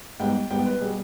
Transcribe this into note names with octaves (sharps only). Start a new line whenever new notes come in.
G#2 G3 B3 G5
G#2 G3 B3 G5
B4
B2 G3 B3 G#4